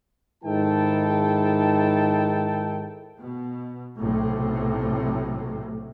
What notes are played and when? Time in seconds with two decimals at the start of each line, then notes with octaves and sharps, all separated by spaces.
0.44 G#2 D#3 E4 A4 G5 A5
3.21 B2
4.00 B1 A2 C3